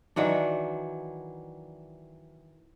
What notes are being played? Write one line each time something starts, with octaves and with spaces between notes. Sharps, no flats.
D#3 E3 F#3 D4